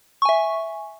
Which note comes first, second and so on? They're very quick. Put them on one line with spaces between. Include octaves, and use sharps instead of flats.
C#6 G#5 E5